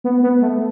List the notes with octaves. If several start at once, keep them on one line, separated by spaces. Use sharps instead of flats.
B3
B3
A3